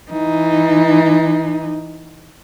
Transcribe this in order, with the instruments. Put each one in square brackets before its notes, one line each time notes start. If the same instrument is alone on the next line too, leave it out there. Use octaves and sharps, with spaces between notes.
[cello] E3 D#4